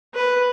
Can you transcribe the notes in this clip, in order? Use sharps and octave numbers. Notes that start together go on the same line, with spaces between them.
B4